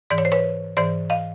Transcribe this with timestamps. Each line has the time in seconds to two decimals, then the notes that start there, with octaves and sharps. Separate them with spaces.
0.10 G#2 E3 D5
0.18 C#5
0.25 C5
0.32 B4 C#5
0.77 G#2 E3 C5 D5
1.10 D#5 F5